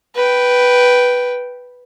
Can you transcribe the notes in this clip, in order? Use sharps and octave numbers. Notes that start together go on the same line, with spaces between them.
B4 G5